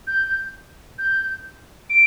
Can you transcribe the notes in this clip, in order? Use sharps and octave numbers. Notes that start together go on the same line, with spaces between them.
G6
G6
D7